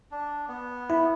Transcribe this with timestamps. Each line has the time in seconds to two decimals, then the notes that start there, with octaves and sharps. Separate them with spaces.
0.11 D4
0.48 B3
0.90 E4